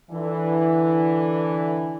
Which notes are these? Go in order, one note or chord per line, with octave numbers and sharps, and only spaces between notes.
D3 E3